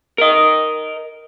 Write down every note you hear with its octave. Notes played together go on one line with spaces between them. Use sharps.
A#4 D#5